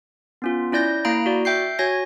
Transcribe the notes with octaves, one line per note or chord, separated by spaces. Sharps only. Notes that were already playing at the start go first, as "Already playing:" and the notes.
B3 C#4 F4
C#4 E4 D5 G6 A#6
A#3 E4 F5 A#5 B5 D7
F#4 D5
E5 G5 G6 C7
F#4 C#5 G#5 G#6 A#6